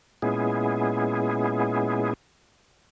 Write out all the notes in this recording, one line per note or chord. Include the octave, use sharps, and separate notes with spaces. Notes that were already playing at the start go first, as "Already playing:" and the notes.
A#2 G#3 B3 C#4 E4 G#4